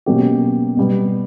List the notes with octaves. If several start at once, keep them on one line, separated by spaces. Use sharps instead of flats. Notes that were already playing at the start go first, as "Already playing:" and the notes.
B2 F#3 A#3 C#4 G4
B2 G3 B3